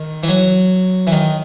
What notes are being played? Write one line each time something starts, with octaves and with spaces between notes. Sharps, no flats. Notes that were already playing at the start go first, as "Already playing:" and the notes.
Already playing: D#3
E3
F#3
E3
D#3